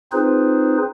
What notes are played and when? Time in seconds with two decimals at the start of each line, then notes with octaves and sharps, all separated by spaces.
0.12 C4 D#4 F4 G#4 B4 C5